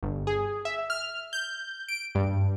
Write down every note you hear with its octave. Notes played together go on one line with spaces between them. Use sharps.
G1
G#4
E5
F6
G6
D7
G2